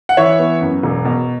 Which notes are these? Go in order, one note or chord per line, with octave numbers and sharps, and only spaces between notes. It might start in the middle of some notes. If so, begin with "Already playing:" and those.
F#5
E3 C#5 E5
B3
F#2
E1
B2